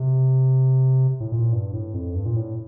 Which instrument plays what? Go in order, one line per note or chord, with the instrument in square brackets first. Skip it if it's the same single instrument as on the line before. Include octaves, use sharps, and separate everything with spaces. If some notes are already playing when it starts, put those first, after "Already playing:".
Already playing: [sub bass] C3
A2
A#2
G2
A2
F2
G2
A#2
A2